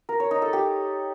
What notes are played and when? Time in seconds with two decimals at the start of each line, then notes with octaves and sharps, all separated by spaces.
0.09 A#4
0.20 C#5
0.31 D#4
0.42 A4
0.53 G4